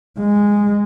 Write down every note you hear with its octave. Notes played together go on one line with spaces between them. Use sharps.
G#3